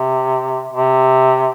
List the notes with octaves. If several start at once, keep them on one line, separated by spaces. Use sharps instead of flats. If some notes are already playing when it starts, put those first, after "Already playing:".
Already playing: C3
C3